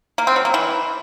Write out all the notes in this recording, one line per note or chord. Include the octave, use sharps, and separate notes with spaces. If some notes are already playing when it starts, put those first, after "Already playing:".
A#3
C4
F#3
A#3
E3